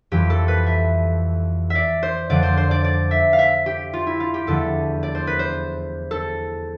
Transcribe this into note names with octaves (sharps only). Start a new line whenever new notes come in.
F2 E3 G3 G4
A4
B4
E5
D5 E5
C5
F2 D3 F3 D5
C5
C5
D5
D5
E5
F5
E5
G4
F4
E4
F4
G4
E2 D3 F3 A3 A4
D5
C5
B4
C5
A4